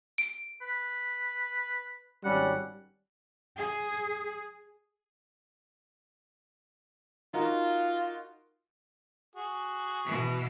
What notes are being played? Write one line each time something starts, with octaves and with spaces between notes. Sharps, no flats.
D7
B4
G#1 G3 C#4 F#5
G#4
D#4 F4 F#4 A#4
F#4 G#4
B2 E3